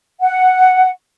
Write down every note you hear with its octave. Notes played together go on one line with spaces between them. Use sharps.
F#5